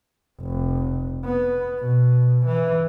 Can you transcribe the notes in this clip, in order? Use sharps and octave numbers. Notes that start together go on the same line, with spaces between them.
F1
B3
B2
E3